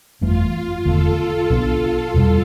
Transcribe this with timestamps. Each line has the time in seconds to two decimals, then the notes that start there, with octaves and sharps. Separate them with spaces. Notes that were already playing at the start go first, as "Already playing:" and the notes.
0.21 G1 F2 E3 A3 F4
0.54 F4
0.85 E1 E2 D3 A3 A4
1.18 F4
1.50 B1 B2 B3 D4
2.14 E2 B2 G3